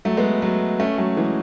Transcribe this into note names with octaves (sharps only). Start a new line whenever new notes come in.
F#3 A3
G#3 B3
F#3 A3
A3 C#4
F#3 A3
E3 G#3